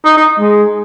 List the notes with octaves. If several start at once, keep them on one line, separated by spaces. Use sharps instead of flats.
D#4
D#4
G#3